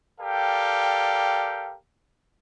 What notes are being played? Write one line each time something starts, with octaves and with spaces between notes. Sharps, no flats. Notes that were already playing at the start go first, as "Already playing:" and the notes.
G4 A4 A#4 D5 F5 G5